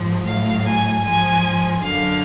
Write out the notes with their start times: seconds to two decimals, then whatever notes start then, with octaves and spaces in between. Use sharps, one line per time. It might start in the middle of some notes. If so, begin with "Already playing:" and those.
Already playing: G#2 F3
0.25 A2 F#3 F5
0.64 G#5
1.03 G#2 F3 G#5
1.81 F#2 D3 F#3 F5